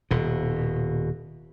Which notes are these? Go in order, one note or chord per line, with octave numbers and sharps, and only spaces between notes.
D#1 B2